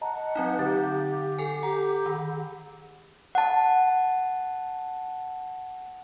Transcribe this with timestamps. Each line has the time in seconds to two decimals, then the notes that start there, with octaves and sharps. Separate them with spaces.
0.01 D#5 F#5 A5 A#5
0.36 F#3 C4 D#4
0.59 D3 G4 F#5 A6
1.39 A4 G#5
1.63 G4 F#5 A#5
2.06 D#3
3.35 F#5 A5